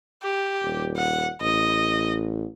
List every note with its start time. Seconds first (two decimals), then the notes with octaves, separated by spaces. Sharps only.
0.22 G4
0.63 D#1
0.96 F#5
1.41 A1 D#5